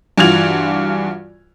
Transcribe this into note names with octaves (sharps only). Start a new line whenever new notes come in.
G2 E3 F4 F#4 G#6 F7